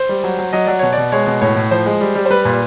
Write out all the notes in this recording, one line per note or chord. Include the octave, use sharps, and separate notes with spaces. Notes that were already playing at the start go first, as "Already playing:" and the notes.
Already playing: C5
G3
F#3
F#3
F#3 D#5
F#3 D5
B2 C#5
B2 D5
G#3 C#5
B2
A2 C#5
A2
F3 C5
G#3
G3
G3
C5
G3 B4
A#2